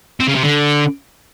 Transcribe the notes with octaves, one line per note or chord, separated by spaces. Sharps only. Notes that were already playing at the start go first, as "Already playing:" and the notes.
C4
C#3
C3
D3